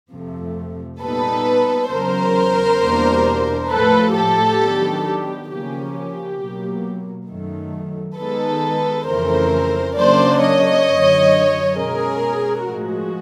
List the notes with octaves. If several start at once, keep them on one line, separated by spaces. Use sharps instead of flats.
F2 C3 F3 A3
A#2 G3 B3 D#4 A4 B4
E2 C#3 F#3 A#4 C5
E2 B2 G3 A#3 D4
A2 F3 A3 A4 B4
G4 A4
D#3 F#3 B3 D4
G4
C#3 F3 A#3 C#4 G4
G4
B2 F#3 A#3
F#2 D#3 F#3 A3
D#3 G#3 B3 D#4 A4 B4
F2 C#3 E3 A3 A#4 C5
C#3 F#3 A#3 D4 C5 D5
C#5 D#5
F#2 D3 F#3
B2 G#3 C#4 G#4 A#4
A2 F3 G#3 F#4